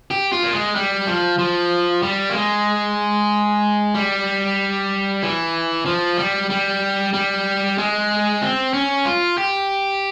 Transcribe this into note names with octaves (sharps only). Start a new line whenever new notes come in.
G4
F4
A#3
G#3
G3
F3
F3
G3
A#3
G#3
G3
E3
F3
G3
G3
G3
G#3
C4
C#4
F4
G4